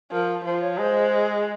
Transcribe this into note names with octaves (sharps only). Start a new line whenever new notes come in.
F3 A#4
F3 C5
C#5
G#3 C5